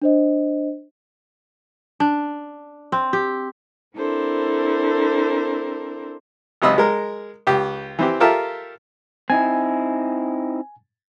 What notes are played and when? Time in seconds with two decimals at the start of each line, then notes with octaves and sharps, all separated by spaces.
0.02 D4 C5 D#5
2.00 D4
2.92 C4
3.13 G4
3.97 C4 D4 E4 A4 A#4 C5
6.62 G#1 C#2 C3 D#5 B5 E6
6.78 G#3 A#4
7.47 C#2 G4
7.99 E3 C4 G4
8.20 F4 G4 A4 A#4 E5 A5
9.30 C4 D#4 E4 G#5